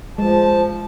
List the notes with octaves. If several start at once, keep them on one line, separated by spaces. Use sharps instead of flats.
F3 G#3 A5